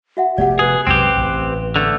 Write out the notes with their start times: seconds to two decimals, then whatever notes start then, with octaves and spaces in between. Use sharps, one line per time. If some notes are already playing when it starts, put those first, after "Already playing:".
0.17 F#4 E5 F#5
0.38 F1 A3 B3 G4 D5 F#5
0.59 G#4 B4
0.87 C2 F#2 G#3 C4 G4
1.16 A1
1.76 D3 A3